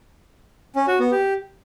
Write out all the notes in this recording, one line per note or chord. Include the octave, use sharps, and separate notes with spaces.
C#4
F#4
B3
G4